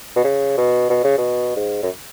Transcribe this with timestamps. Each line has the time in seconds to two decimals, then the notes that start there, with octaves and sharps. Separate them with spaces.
0.16 B2
0.24 C#3
0.58 B2
0.90 B2
1.04 C#3
1.18 B2
1.56 G#2
1.83 F#2